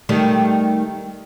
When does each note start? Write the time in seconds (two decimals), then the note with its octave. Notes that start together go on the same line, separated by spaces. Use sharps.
0.09 D#3 G3 A3